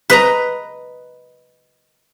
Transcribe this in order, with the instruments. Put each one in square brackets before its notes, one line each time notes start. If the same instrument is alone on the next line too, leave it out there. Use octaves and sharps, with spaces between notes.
[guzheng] B4 D#5 A#5